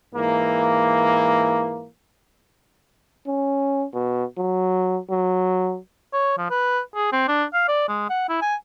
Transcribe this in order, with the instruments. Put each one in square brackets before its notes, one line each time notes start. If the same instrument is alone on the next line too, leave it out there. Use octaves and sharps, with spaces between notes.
[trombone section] G#2 E3 A#3
[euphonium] C#4
B2
F#3
F#3
[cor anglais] C#5
F3
B4
G#4
C4
D4
F5
D5
G#3
F#5
E4
G#5